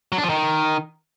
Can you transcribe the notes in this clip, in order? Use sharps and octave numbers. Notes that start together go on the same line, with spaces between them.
F#3
D4
F3
D#3